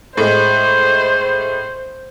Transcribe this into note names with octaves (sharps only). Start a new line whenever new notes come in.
A2 G#3 C5